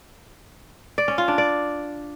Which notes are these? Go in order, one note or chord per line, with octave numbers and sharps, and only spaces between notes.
D5
C#4
F4
D4
D5